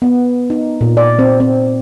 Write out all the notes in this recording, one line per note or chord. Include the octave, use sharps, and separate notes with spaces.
B3
D#4
A#2
D5
C4
C4